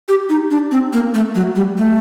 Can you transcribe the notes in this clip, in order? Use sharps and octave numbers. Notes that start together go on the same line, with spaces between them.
G4
D#4
D4
C4
A#3
A3
F#3
G3
A3